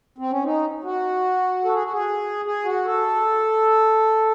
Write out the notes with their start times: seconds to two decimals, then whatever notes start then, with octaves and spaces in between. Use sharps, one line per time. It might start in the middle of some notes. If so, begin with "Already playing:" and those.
0.18 C4
0.31 C#4
0.44 D#4
0.84 F#4
1.65 A4
1.74 G#4
1.83 F#4
1.92 G#4
2.45 G#4
2.65 F#4
2.85 A4